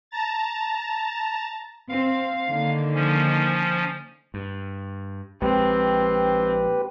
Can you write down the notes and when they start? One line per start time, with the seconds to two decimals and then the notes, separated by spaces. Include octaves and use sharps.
0.11 A5 A#5 A6
1.89 C4 F5
2.48 D3 D#3 A#3
2.95 F3 C#4
4.34 G2
5.42 A#1 G#3 C4 G4 B4